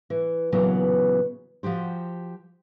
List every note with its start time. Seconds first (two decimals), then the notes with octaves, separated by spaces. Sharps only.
0.10 E3
0.52 A#2 C#3 E3 F#3 B3
1.63 F3 F#4 G4 C5